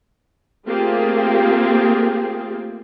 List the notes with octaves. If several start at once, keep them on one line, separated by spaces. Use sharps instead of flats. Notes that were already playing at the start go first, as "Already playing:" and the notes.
A3 A#3 C4 F4 G4 G#4